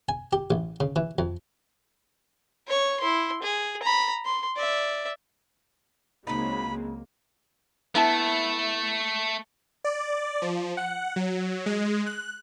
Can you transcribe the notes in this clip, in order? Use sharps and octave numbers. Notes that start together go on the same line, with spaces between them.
G#5
G4
A1
C#3
E3
F2
C#5 C#6
E4 C6
G#4
A#5 B5
C6
D5 E5
C#2 C#3 F#3 G#3 A#3 C4 D#4 B5
A3 B3 E4 A5
D5
F3
F#5
F#3
G#3
F#6